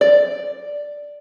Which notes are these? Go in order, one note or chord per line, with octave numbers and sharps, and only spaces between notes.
D5